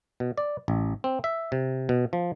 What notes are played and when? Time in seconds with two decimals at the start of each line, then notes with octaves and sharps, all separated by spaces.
0.20 B2
0.38 D5
0.68 A1
1.04 C4
1.24 E5
1.52 C3
1.89 B2
2.13 F3